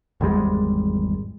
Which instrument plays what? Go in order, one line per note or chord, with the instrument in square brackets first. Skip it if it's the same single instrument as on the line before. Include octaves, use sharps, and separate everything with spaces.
[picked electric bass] G#1 E2 G3 G#3